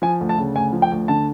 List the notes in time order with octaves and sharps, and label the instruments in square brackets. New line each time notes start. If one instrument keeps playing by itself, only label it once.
[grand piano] F3 G#5
D2
A5
C#3
D2 G#5
F3
G5
D2
D3 A5